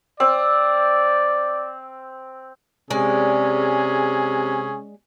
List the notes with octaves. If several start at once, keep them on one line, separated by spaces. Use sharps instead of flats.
C4 D5
C3 G#3 C#4 G#4 D5